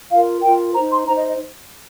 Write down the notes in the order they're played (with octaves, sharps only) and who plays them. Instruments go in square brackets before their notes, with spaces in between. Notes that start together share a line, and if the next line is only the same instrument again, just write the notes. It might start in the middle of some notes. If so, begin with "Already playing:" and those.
[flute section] F4 A#4 F5
F4 A#4 G5
D#4 C5 A#5
C6
D#4 C5 A#5
D#5
D#5